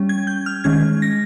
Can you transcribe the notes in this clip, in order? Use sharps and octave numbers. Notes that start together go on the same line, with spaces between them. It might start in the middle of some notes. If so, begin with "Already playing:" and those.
Already playing: G3 C#4
G#6
G6
F6
D#3 G#3 C#4 G#6
A#6